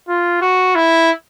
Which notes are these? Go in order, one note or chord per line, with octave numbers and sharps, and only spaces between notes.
F4
F#4
E4